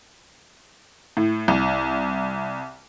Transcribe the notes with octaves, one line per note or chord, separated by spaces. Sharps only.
A2
C2